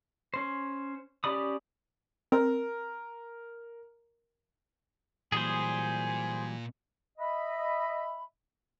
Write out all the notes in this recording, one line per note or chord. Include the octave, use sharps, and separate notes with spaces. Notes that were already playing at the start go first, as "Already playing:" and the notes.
C#4 C5
C#4 G4 D5 B5 D#6
C4 A#4
A#2 E3 F#3 G3 G#4 C5 G#5
D#5 E5 B5